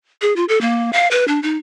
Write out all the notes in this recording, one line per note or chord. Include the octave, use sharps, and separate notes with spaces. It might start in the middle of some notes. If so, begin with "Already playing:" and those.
G#4
F4
A4
A#3
F5
B4
D4
D#4